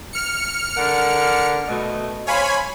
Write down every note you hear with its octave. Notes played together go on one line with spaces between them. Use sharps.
F6 C#7
D3 A#4 F#5
B2 A3 D#5
C5 C#5 F5 G#5 B5